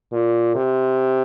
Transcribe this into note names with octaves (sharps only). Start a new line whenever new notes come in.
A#2
C3